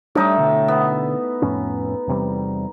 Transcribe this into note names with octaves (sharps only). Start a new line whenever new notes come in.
A2 G3 D4 D#4 E5
B2 D3
B3
F2 A2 C#4
E2 C3 G3